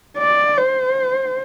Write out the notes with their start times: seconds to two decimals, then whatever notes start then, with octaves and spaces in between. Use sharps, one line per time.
0.19 D5
0.58 C5